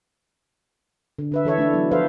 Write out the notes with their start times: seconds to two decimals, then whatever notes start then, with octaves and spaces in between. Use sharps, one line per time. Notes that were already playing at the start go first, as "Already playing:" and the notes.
1.19 D3
1.32 D3 B4 E5
1.45 E3 A4 C#5 E5
1.58 A3 D4 E4
1.73 F#3 B3
1.91 F3 A4 B4 C5 E5 F5